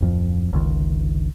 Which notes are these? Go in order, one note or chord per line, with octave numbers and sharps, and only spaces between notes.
D1 F2 F3
G1 C#2 D#3